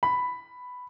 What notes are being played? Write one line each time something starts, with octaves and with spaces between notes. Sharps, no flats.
B5